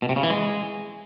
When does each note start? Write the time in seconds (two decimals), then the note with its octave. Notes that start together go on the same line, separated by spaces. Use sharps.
0.02 B2
0.09 C3
0.16 C#3
0.23 E3
0.30 G#3